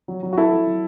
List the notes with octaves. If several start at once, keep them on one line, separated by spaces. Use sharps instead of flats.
F#3
F#3
F#4
F#3 E4 A4
F#3
F#3